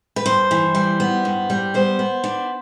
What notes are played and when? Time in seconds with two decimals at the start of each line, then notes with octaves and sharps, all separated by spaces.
0.16 B4
0.26 G2 C5
0.51 E3
0.75 G3
1.00 B3
1.25 G2
1.50 G3
1.74 B3 C5
1.99 B3
2.24 D4